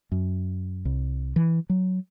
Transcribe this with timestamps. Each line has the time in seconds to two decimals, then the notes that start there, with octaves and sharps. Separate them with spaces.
0.12 F#2
0.85 C2
1.36 E3
1.70 F#3